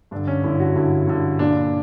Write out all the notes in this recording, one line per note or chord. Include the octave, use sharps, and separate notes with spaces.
G2 D3 D4
C#4
G2 D3 E4
F#4
G2 D3 E4
G2 D3
A#2 D4